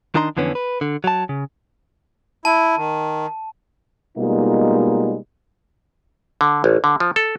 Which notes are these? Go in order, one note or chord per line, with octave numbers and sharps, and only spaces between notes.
D#3 D4 D#4 A#5 C6
F2 D3 E3 B3 C#4
B4
D3
F#3 A5
C#3
E4 A5
D#3
B2 G3 G#3 A#3 D#4 F4
D3
A1
D3
F3
A4